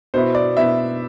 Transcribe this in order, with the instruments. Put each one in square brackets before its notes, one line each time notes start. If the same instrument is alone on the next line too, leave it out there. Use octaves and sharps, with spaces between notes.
[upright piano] B2 B3 E4 C5
D5
B2 B3 E4 E5